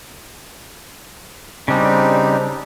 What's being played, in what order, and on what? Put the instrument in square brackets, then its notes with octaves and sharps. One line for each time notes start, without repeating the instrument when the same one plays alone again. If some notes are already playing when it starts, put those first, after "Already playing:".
[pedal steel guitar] C#3 G3 [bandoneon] C4 D4 D#4